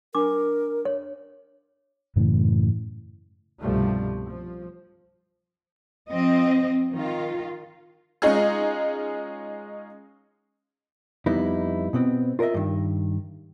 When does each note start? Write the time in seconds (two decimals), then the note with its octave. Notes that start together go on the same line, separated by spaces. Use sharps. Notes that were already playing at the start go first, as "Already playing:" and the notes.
0.15 D4 A#4 D6
0.85 C#5
2.16 F#2 A2 C#3 E3
3.59 C2 G2 B2 F3 G3 A3
4.26 F3
6.10 F3 C4 D#5
6.93 D#3 F4
8.22 G#3 C#4 D#4 F4 G#4
11.26 F2 G3 B3 D#4 E4
11.93 B2 B3 C4
12.39 F4 A#4 C#5 D#5 E5
12.54 G2 D#3